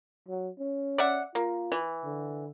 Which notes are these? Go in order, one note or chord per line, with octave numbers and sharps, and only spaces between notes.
F#3
C#4
D5 E5 F#5
A#3 F4
E3
D3